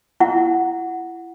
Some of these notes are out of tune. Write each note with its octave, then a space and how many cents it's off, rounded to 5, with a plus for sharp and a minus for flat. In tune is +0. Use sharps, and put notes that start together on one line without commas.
E4 +30 F#5 +0